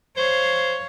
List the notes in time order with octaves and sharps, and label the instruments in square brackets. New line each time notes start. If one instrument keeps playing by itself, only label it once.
[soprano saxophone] C5 [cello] C#5 F5